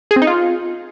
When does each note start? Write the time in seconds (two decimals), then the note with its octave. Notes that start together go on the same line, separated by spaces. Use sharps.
0.11 G#4
0.16 C4
0.22 D#4
0.27 F4